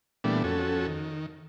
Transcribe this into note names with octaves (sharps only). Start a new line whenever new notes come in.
A#2 E3 G3 A3 B3 D4
F2 C#4 F#4 A4
D#3